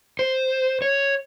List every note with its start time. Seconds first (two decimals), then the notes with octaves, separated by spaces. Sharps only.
0.19 C5
0.82 C#5